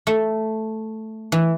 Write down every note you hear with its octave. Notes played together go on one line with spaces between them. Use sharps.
A3
E3